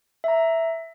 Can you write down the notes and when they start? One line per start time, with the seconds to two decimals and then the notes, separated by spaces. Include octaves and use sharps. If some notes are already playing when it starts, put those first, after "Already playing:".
0.24 E5 A#5